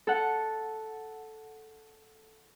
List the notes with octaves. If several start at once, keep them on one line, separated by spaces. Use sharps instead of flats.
A4 F#5